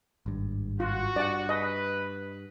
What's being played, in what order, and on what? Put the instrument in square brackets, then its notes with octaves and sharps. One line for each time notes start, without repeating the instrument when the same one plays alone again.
[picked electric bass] G#1 G2
[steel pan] F4 [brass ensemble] F#4
[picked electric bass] G2 [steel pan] D5 F#5
[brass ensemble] B4 [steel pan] D#5